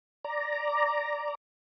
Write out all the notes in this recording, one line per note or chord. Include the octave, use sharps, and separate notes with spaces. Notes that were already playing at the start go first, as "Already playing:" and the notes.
D5 A#5